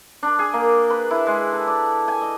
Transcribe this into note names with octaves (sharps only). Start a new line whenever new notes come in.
D4
G#4
A#3
B4
E4
G#3
A4
D5
G#5
D#5